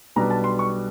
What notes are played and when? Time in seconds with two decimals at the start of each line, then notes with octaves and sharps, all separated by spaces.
0.16 B1 B2 G3 B3 D4 A#5
0.30 A5
0.44 C6
0.59 C#6